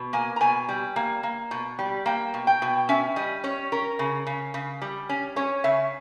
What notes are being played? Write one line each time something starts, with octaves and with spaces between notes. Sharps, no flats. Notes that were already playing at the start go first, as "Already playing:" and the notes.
Already playing: B2
A#3 G#5
A#5
B2 G#5
G3
A#3
A#3
B2
G3
A#3 G5
B2
G5
B2
C#4 E5
G3 D#5
C#4 C#5
C#4 A#4
C#3
C#3
C#3
G3
C#4
C#4 C#5
C#3 E5